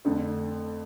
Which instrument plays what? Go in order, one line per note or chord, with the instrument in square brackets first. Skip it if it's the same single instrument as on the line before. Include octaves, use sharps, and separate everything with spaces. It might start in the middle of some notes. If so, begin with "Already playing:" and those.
[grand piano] F2 D3 A3